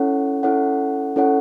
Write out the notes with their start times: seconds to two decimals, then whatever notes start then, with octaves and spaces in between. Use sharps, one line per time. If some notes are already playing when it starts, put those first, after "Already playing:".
Already playing: C#4 E4 A4 C#5 F#5
0.43 C#4 E4 A4 C#5 F#5
1.16 C#4 E4 A4 C#5 F#5